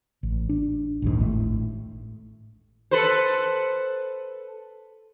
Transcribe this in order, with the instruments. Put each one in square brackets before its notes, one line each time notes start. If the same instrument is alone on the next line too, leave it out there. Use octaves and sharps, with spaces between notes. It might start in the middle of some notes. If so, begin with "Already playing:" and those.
[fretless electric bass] A1
D4
A#1 D#2 G#2
G#1 A2 A3
[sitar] A4 B4 C5